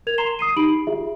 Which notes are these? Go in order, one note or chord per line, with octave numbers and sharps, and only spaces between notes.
A#4 G#6 F7
A#5 C6 C7 E7 G7
D#6 C7 D#7
D#4 G4 B5 D7 F#7
F4 G4 G#4 E5